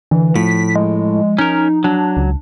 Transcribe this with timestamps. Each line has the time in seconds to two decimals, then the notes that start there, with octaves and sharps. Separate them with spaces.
0.11 D3 E3
0.36 A2 F3 B6
0.76 G#3
1.38 C#4 D#4 A#4
1.84 F#3 D4
2.17 C#2